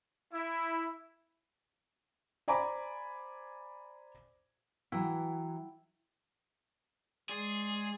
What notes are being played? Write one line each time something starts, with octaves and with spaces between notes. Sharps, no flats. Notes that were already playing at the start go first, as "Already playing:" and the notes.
E4
C5 D5 G#5 A#5 B5 D6
E3 F#3 E4 G5
G#3 G#4 D5 C6